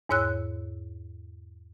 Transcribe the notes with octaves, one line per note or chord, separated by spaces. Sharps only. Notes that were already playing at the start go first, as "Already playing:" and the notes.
E2 G#2 C#5 E6 F#6